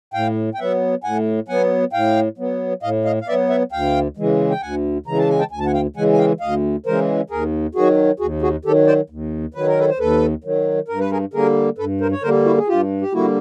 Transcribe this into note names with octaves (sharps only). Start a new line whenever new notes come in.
A2 F5 G5
G5
F#3 B3 E5 F#5
A2 F#5 G#5
F#3 B3 F#5 G#5
A2 F5 G5
F#3 B3
A2 D#5 F5
D#5 F5
F5
F#3 B3 D5 E5
E5 F#5
D2 F5 G5
C#3 E3 G#3
G5
D2 F#5 G#5
C#3 E3 G#3 A#5
A5
G#5
G5 A5
D2 G#5
A5
F#5 G#5
F5 G5
C#3 E3 G#3 F#5 G#5
G#5
F5 G5
D2 D#5 F5
C#3 E3 G#3 A#4 C5
D#2 G#4 A#4
D#3 F#3 F#4 G#4
D#2 F#4 G#4
F#4 G#4
D#3 F#3 G4 A4
C5 D5
D#2
D#3 F#3 B4
A#4
A4 B4
C5
D#2 A4 B4
D#3 F#3
G2 A#4
B4
G#4 A#4
D3 G3 A#3 G#4 A#4
G2 A4 B4
A#4 C5
C#5
D3 G3 A#3 A#4 C5
E4 F#4
G#4
G2 F4 G4
G4
D3 G3 A#3 E4 F#4